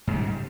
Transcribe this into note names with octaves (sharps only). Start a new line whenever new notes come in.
G#2 C#3 G3